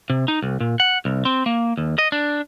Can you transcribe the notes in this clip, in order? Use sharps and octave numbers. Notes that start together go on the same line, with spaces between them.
C3
D#4
C2
A#2
F#5
C2
C4
A#3
D#2
D#5
D4